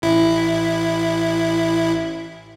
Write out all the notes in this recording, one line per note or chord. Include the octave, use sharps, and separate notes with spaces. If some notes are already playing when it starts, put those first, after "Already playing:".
A1 E4